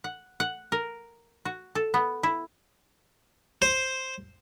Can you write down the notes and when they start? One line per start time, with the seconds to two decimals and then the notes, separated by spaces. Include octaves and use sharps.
0.04 F#5
0.40 F#5
0.72 A#4
1.45 F#4
1.75 A4
1.94 B3
2.23 E4
3.62 C5